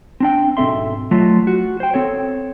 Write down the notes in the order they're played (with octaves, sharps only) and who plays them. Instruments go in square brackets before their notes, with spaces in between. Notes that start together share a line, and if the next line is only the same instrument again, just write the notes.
[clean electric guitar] C4 D4 G5
B1 G#2 C4 A4 E5 C6
F#3 A3 F4
F#4
C5 G5
C4 A4 C#5